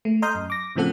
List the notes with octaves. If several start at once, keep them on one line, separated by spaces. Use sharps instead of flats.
A3
D#5 A#5 C6 D#6 F6 G6
F#2
D6 A#6
A2 C#3 F3 C4 A4 F#5